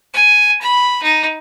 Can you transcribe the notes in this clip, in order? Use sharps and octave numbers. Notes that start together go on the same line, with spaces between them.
G#5
B5
D#4